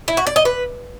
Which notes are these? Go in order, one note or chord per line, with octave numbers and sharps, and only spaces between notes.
E4
F#4
D5
D#5
B4